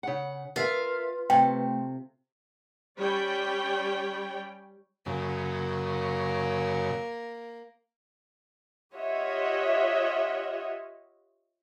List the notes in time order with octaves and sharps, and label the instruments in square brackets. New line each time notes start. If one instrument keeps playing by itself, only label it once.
[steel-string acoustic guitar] C#3 F#5
[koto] F4 [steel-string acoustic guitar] A#4 E5 F5 [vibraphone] B4
[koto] C3 [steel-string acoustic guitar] A3 [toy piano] G5
[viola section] G3 C#4 C#5 D5 G5 B5
[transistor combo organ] F#2 C#3 [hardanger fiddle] A#3
[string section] F4 G4 C#5 D#5 E5 F#5